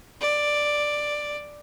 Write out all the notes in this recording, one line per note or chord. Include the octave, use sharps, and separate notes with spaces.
D5